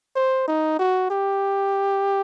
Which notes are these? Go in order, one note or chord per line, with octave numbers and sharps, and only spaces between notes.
C5
D#4
F#4
G4